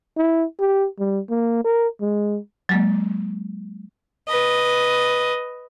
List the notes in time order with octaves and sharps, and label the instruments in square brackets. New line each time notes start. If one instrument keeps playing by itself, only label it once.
[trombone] E4
G4
G3
A#3
A#4
G#3
[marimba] F#3 G#3 A#3
[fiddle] B4 D#5